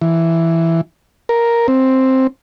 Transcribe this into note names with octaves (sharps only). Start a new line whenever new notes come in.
E3
A#4
C4